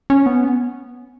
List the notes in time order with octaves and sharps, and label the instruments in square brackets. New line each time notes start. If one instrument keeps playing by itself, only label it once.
[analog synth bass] C#4
B3